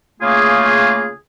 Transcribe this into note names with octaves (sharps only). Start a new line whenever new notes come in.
C#3 A3 A#3 F4 G#4